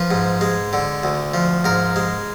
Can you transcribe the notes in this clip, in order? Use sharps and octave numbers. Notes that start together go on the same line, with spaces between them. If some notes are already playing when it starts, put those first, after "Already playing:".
Already playing: F3 B4
G#2
G#3
D3
D2
F3
G#2 A#4
G#3